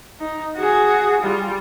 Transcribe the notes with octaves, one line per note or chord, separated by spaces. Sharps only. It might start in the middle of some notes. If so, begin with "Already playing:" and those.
D#4
F#4 G#4
G3 F4